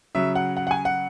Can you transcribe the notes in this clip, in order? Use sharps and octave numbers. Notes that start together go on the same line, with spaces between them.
C#3 F#3 E5
F#5
F#5
F#5
G#5
F#5